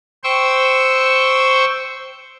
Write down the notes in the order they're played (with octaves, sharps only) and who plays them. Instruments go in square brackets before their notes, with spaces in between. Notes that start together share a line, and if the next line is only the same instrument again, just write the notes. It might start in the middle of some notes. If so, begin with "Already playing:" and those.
[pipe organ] C5 G5 C#6 E6